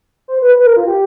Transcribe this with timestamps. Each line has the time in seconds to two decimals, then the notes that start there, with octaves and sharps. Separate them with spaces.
0.28 C5
0.42 B4
0.57 B4
0.66 A#4
0.77 F4
0.87 G4